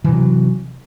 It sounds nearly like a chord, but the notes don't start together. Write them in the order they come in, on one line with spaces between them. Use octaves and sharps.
E3 C3 F#3